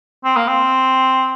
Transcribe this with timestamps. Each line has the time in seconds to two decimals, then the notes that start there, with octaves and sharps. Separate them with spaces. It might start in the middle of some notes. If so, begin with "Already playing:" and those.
0.24 C4
0.36 A#3
0.48 C4